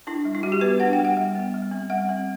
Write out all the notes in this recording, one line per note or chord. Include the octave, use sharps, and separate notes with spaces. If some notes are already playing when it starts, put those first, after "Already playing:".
D4 E4
G3
E4
G3 F#4
G4
B3 B4
D4 F#5
G5
G3
F#5
G3
B3
G3
C4
G3 F#5
C4